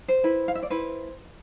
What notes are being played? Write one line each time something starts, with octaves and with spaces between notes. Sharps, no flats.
C5
E4 B4
F5
E5
D5
E4 B4 C5